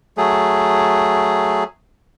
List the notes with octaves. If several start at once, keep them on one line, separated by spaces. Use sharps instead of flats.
F#3 A3 G#4